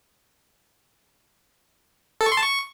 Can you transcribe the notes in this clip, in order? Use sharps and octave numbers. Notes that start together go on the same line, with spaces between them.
A4
C#6
C6
A5
C#6